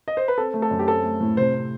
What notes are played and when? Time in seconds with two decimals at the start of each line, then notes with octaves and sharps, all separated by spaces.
0.08 D#5
0.17 C5
0.28 B4
0.37 C4 A4
0.54 A3
0.62 A4
0.71 F#2
0.79 G4
0.88 C4 A4
1.03 A3
1.20 A2
1.37 C3 C5
1.54 C4